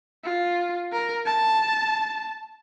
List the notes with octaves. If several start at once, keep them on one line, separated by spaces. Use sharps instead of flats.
F4
A#4
A5